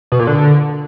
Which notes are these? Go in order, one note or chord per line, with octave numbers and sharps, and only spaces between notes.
B2
A#2
D3